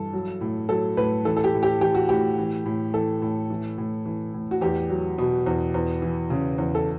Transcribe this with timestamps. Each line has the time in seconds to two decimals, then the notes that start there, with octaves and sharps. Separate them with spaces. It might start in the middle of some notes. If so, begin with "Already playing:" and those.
Already playing: G2 E3 A4
0.13 F#3
0.41 A2
0.69 F#3 A4
0.97 A2 B4
1.25 E3 A4
1.37 A4
1.44 G4
1.54 A2
1.63 G4
1.81 E3 G4
1.95 F#4
2.09 A2 G4
2.38 E3
2.66 A2
2.93 E3 A4
3.22 A2
3.50 E3
3.78 A2
4.05 E3
4.34 A2
4.51 F#4
4.61 E2 G4
4.90 F#3
5.18 B2
5.46 E2
5.74 E2
6.02 E3
6.30 C#3
6.58 E2
6.75 A4